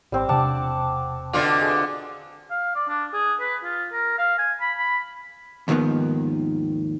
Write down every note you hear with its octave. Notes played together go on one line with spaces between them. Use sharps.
G#1 G3 C4 D6
E1 C3 D4 D5 F#5 A5
B2 D3 F4 D5
G#4
F5
D5
D4
G#4
B4
F4
A#4
F5
G#5
B5
B5
D#2 G#2 D#3 F3 B3